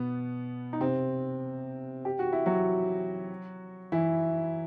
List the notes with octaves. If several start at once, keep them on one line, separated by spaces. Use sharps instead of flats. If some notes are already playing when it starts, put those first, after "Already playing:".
Already playing: B2 B3
D#4
C3 C4
G4
F#4
E4
F#3 F#4
E3 E4